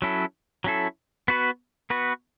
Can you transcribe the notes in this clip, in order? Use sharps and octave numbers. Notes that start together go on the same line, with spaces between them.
F#3 C#4 E4 A4
F#3 C#4 E4 A4
B3 F#4 B4
B3 F#4 B4